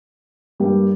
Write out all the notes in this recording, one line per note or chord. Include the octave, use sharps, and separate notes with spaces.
G2 G3 A#3 G4